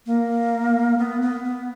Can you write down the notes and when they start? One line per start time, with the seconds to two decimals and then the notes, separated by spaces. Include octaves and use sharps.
0.06 A#3
0.98 B3
1.22 B3
1.44 B3